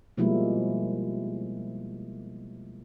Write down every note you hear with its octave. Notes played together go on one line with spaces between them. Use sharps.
B2 F3 G3 G#3 A#3 E4